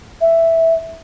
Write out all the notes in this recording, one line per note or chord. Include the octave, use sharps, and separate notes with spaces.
E5